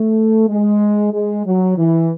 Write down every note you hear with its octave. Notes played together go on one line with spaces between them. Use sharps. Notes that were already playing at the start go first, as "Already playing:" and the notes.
Already playing: A3
G#3
G#3
F#3
E3